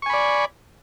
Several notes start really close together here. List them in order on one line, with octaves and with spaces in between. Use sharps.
C#6 G#5 B5 D5